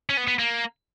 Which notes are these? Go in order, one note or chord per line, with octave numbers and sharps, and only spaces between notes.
C#4
B3
B3
A#3